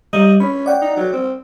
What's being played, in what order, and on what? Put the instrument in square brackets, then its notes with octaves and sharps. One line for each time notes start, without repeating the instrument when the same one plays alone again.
[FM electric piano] G3 [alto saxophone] D#5
[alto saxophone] C#4 [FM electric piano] B5
[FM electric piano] D5 F#5 G5
[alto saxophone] D#4
F#3
C4